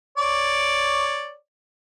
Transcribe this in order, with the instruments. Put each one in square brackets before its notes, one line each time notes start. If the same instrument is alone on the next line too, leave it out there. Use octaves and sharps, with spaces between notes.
[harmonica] C#5 D5